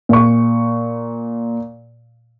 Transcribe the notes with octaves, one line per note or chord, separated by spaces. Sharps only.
A#2 C#6